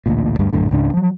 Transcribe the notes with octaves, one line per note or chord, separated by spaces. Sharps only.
A1 D2 A#2
D2 G2 G3
A#1 F#2 A2 D3
C#2 G#2 C#3 D4
F3 F#3